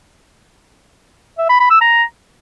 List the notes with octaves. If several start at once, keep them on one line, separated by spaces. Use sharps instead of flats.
E5
B5
B5
E6
A#5